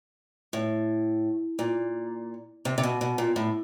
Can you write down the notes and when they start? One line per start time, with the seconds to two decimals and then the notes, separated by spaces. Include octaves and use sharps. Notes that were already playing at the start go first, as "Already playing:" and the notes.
0.53 A2
1.59 A#2
2.65 C3
2.78 C3
2.83 B2
3.01 B2
3.18 A#2
3.36 A2